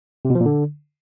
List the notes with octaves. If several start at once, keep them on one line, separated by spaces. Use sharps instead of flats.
C3
B2
F3
A#2
D3